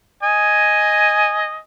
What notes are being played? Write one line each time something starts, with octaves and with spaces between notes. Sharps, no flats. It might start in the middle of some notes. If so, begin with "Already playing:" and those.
D#5 G#5